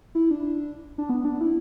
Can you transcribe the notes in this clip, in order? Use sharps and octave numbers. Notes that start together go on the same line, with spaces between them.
E4
D4
D4
B3
D4
E4